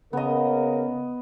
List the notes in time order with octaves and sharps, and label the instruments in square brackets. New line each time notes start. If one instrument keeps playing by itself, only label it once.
[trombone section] C#3 A#4 [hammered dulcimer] B3 D#5